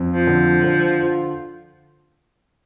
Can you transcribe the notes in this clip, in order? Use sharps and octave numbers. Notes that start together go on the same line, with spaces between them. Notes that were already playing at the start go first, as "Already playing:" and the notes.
Already playing: F2
F3
D3
D3
F4